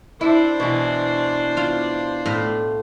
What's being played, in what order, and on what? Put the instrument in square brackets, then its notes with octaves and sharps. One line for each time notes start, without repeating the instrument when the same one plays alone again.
[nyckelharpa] D4 C5 [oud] E4
[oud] B2 E3
[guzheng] F4
A2 F4